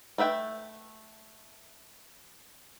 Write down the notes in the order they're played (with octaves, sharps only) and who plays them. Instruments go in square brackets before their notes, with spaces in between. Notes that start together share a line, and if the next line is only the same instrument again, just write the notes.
[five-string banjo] A3 B4 E5 G5